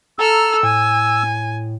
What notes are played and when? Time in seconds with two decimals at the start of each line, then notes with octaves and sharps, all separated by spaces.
0.19 A4 A#5 E6 F6
0.63 A2 G#5